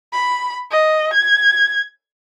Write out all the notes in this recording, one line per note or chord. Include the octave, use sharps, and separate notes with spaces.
B5
D#5
G#6